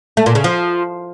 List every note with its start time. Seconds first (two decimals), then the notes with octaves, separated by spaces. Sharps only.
0.17 A3
0.26 A#2
0.35 C#3
0.44 F3